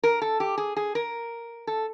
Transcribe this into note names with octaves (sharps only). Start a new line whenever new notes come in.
A#4
A4
G4
G#4
G#4
A#4
A4